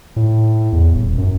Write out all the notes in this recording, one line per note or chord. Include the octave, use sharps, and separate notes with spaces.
A2
E2
D#1
F#2